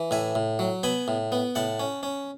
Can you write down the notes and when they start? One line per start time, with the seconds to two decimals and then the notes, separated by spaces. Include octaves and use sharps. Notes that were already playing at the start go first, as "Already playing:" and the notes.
Already playing: E3
0.11 A2 E5 G#5
0.35 A2
0.59 F#3
0.83 B3 G#5 B5
1.08 A2
1.32 B3
1.55 A2 F#5 A5
1.79 C#4
2.03 C#4